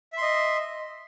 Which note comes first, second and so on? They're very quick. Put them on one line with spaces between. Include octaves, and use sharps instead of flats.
E5 C6 D#5